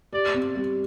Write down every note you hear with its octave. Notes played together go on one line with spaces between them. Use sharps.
G4 D5
C4
G3